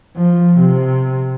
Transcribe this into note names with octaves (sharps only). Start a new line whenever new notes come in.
F3
C3